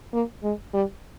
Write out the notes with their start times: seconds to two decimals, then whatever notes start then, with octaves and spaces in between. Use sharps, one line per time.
0.13 A#3
0.43 G#3
0.74 G3